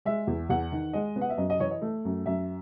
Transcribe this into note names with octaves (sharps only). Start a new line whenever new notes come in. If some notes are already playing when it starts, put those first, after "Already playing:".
G#3 E5
E2
E2 F#5
D#3
G#3 D#5
B3
F#5
E5
F#2 D#5
D#5
E3 C#5
D#5
A3
F#2
F#2 E5